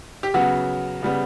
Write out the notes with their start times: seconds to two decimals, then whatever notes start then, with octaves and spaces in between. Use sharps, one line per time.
0.23 G4
0.34 C#3 F#3 B3 F#4
1.02 C#3 G3 B3